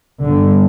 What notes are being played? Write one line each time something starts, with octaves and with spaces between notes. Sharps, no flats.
G1 G2 D3